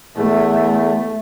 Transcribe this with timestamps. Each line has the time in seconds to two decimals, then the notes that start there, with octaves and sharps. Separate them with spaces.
0.17 E2 A3